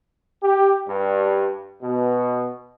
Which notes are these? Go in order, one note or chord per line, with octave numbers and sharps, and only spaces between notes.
G4
G2
B2